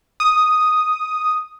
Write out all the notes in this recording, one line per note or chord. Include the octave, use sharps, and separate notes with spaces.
D#6